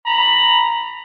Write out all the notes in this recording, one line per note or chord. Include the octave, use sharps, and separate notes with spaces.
A#5 B5